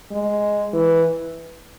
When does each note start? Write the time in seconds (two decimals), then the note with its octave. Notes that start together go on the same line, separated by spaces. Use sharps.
0.12 G#3
0.73 E3